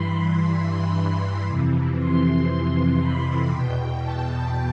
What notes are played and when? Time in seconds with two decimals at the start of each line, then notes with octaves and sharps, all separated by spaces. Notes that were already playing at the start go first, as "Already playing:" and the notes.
Already playing: G2 E3 B5 C6
0.44 B5
1.47 F2 C3 E3
1.98 C6
3.00 B5
3.51 E2 B2 G5
4.02 A5